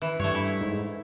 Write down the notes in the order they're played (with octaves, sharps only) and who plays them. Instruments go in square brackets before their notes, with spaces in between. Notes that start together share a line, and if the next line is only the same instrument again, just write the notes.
[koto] E3
[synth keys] G2 [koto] A3 C#5
[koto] E4
[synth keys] G#2